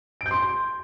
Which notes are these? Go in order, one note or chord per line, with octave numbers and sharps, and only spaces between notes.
D7
G6
C6